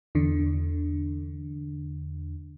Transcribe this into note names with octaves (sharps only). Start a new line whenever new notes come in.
E2 D3